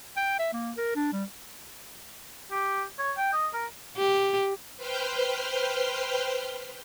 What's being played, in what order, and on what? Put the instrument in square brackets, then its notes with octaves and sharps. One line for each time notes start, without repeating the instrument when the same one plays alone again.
[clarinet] G5
E5
A#3
A#4
D4
G3
[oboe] G4
C#5
G5
D#5
A#4
[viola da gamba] G4
[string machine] B4 C5 G5 F6 G6